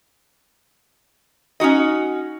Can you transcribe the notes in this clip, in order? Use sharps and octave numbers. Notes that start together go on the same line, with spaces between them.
C#4 D#4 F#4 D#5